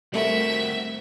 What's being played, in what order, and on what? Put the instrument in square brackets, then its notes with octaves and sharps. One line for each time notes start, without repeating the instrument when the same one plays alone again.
[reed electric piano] G3 A3 [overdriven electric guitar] C4 F#4 [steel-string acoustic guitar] A#4 F#5 [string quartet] E5